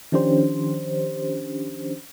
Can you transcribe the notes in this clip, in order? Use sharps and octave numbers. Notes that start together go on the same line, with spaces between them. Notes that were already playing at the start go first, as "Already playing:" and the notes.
D#3 F3 C#4 D4 G4 C5